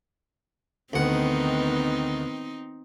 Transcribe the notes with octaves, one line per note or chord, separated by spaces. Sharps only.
D2 D#3 B3 C4 D#4 F#5